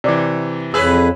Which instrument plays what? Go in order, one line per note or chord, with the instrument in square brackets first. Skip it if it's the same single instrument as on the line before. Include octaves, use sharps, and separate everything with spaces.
[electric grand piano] C3 E3 [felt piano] D5 D6
[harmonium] F2 [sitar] G#4 B4 [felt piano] C#5 E6